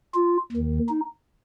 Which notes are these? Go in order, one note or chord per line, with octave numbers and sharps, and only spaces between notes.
F4
D#2 D#3
D#4